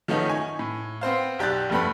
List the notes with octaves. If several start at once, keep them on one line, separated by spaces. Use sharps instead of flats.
D#3 F3 A3 B3 C#4 D#4
G#5 C#6
A2
B3 C4 C5 F5
B1 G4 D5 F#6 A6
F1 G2 A3 B3 B5